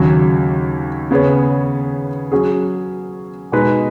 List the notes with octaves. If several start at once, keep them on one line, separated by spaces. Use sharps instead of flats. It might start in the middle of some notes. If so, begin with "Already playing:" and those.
Already playing: D#2 C#3 F#3
C#3 B3 G#4 C#5
F#3 C#4 G#4
B2 G#3 D#4 B4